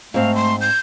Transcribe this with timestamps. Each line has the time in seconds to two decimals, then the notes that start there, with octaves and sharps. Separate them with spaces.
0.14 G#2 A3 C4 F5
0.35 C6
0.61 G6